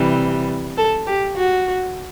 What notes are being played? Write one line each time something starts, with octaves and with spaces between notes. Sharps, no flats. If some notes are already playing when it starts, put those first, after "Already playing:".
Already playing: C3 E3 G3
A4
G4
F#4